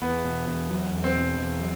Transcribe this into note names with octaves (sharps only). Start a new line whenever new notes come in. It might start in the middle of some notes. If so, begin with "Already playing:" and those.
E2 B3
B2
E2
F#3
E2
C4
B2
E2
F#3